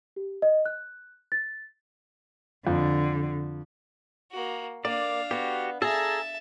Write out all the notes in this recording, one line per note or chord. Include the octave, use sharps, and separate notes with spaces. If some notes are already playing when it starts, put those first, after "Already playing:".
G4
D#5
F#6
A6
F2 D3
A#3 F#4
A#3 D4 D5 F5
B3 F#4 G4
G#4 A4 E5 A5 A#5